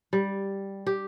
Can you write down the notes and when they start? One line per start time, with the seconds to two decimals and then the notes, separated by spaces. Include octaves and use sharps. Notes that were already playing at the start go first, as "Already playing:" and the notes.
0.13 G3
0.87 G4